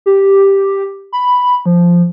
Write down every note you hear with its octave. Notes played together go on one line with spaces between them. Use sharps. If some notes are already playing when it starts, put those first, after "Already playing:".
G4
B5
F3